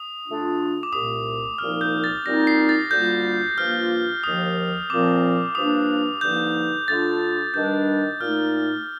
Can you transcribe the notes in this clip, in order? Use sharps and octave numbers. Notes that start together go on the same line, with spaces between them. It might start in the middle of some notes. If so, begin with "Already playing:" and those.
Already playing: D#6
D3 A3 D4 F4
D6
C2 A#2 A3 D#6
C2 A#2 F3 A#3 D#4 F6
G6
A6
A#2 G3 C4 D#4 A#6
C7
A6
D2 D3 G3 A#3 F4 G6
G2 F3 A#3 F4 F6
D#2 D3 F3 D#6
A#2 F3 C4 D6
G2 F3 A#3 D4 D#6
G2 D3 F3 A#3 D#4 G6
D3 A3 D4 F4 A6
G2 D#3 G3 D4 G6
A#2 A3 D#4 F6